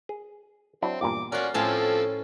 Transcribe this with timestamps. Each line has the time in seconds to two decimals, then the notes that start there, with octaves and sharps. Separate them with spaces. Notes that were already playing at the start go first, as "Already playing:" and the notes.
0.09 G#4
0.82 F#3 C4 D4 E4
1.01 E2 G2 A#2 D6
1.32 C#4 F4 F#4 A#4 D5
1.54 A2 F3 C4 C#4 A4 A5